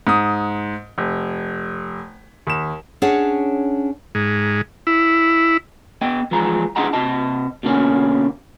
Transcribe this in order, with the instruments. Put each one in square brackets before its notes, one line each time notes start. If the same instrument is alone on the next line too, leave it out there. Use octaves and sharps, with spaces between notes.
[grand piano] G#2 D#6
F1
D#2 E7
[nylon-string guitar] C#4 D4 G#4 C#5 F#5 A5
[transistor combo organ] G#2
E4
[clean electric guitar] B3 D#5 G5
E3 F3 G#3 A#5
D4 E4 G#4 D#5 F#5 A#5
C3 D#5 A5
B2 D3 A#3 C#4